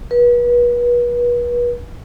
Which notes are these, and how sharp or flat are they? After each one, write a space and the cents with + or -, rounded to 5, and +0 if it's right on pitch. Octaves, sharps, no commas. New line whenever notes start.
B4 -35